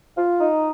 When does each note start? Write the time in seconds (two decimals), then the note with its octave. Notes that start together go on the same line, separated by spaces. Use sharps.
0.16 F4
0.41 D#4